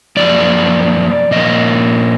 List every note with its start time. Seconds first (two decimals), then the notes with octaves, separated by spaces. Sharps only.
0.17 F#2 F3 A#3 D5
1.31 A#2 F3 A#3 D#5